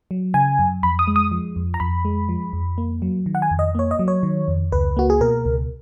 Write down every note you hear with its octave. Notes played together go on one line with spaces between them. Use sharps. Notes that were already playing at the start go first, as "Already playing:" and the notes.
F#3
C#3 G#5
F#2
F2 B5
D#6
G#3
D#6
F3
F2
A#5
F2 B5
G#3
F3
F2
A#3
F#3
D#3
F#5
G#5
F2
D#5
A#3 C#5
D#5
F#3
C#5
D#3
F2
C#2 B4
A#3 F#4
G#4
B2 A#4
C#2